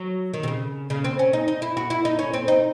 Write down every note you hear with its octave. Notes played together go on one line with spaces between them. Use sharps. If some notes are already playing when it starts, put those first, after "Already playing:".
Already playing: F#3
D#3
C3
C#3
C#3
C4
C#4
D#4
D#4
E4
F#4
E4
D#4
C#4
C4
D#4